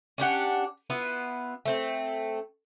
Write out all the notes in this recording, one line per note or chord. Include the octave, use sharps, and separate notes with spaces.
C#4 D4 G4 F#5
B3 E4 F4
A3 C4